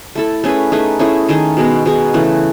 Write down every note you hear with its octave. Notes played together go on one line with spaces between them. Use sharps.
A3 E4 A4
A3 C#4 G#4 B4
A3 D#4 G#4 B4
A3 C#4 E4 G#4
D#3 A3 D#4 G#4
B2 G#3 B3
B2 G#3 D#4 G#4
C#3 E3 A3